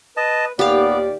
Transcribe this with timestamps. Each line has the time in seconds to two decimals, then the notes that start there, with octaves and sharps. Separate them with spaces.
0.17 B4 D#5 A5
0.59 D#2 A#2 D#3 B3 G4 D5 F5